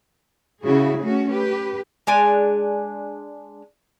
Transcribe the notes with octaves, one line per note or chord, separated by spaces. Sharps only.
C#3 E4 F#4 G#4
A3 C#4 F#4
G4 B4
G#3 D4 G#5